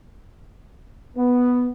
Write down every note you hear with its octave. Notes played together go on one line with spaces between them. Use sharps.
B3